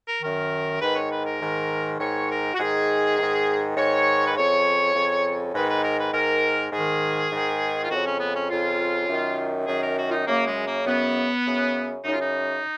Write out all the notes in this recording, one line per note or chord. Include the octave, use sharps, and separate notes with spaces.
A#4
F#2 D#3 A#4
G#2 D#3 B4
C#5
B4
A#4
G#2 D#3
G#2 D#3 C#5
A#4
F#4
G#2 D#3 G#4
G#2 D#3
G#2 D#3 C#5
B4
F2 C#3 C#5
F2 C#3
G#2 D#3 B4
B4
A#4
B4
G#2 D#3 A#4
G#2 G#4
D#3
G#2 D#3
F4
F2 C#3 F#4
C#4
B3
C#4
F2 C#3 F4
F#2 D#3
F#2 D#3 G#4
A#4
F#4
F4
D#4
F#2 C#3 A#3
G#3
A#3
F#2 C#3 B3
F#2 C#3
F#2 C#3 D#4
F4
D#4